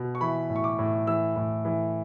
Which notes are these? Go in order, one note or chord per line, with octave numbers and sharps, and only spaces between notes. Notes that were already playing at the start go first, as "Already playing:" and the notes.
Already playing: B2
C#6
E3 B5
A2
C#6
D6
A2
E3 E6
A2
E3